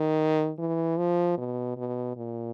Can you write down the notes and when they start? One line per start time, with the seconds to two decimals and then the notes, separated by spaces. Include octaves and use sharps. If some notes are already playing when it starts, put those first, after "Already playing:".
Already playing: D#3
0.59 E3
0.98 F3
1.38 B2
1.77 B2
2.17 A#2